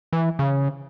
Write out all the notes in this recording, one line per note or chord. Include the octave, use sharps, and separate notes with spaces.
E3
C#3